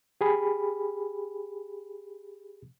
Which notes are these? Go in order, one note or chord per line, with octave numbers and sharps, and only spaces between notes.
G4 G#4 B5